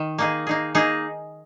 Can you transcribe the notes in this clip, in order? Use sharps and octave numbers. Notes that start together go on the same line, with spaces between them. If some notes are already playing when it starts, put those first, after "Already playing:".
Already playing: D#3
A#3 D#4 G#4
A#3 D#4 G#4
A#3 D#4 G#4